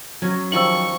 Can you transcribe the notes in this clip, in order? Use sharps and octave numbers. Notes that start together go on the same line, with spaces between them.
F#3 C#4
D#3 F3 G3 C#6 E6 F#7